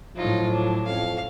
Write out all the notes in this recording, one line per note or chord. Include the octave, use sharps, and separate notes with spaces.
A2 F3 F#3 D#4 F4
D4
F2 C#4 F5